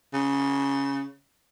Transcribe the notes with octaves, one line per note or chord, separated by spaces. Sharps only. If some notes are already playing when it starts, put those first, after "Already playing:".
C#3